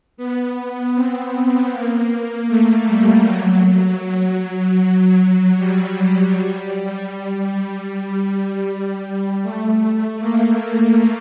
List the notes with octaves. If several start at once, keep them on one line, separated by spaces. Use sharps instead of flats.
B3
C4
A#3
A3
G3
F#3
G3
G3
A3
A#3